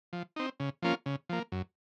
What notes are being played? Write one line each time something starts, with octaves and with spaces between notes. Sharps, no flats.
F3
C4 D#4
C#3
F3 A#3 C#4 F4
C#3
F3 A#3
F#2